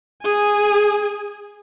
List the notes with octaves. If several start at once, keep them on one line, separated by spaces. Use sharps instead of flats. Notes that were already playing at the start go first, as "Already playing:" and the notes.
G#4 G#5